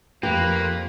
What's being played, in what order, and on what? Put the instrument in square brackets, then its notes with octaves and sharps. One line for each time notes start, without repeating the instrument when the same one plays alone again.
[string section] F2 [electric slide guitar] A#3 [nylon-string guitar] G4 [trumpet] B4